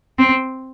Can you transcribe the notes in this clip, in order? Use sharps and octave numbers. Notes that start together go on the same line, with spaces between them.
C4